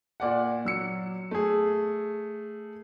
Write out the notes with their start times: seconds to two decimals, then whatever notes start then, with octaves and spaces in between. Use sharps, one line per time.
0.20 A#2 D5 F#5
0.65 F#3 E6 C#7
1.31 A3 G#4